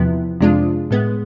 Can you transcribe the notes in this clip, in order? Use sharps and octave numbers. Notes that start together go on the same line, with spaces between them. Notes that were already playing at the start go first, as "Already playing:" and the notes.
Already playing: E2 C3 F3 B3 E4
F2 C3 G#3 D4 F4
A2 G#3 B3